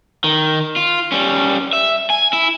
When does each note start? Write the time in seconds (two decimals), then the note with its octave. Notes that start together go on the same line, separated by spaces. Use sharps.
0.24 D#3
0.76 F4
1.12 G3 C#4
1.73 E5
2.10 G#5
2.33 E4